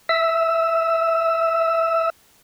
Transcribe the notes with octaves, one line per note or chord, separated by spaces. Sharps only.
E5 E6